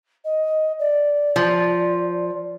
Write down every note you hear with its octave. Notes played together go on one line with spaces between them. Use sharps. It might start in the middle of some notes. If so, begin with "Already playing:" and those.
D#5
D5
F3